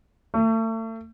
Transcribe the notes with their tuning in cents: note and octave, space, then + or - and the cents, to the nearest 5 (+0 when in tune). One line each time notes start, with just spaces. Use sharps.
A3 +35